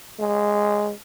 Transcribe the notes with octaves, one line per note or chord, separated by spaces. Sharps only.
G#3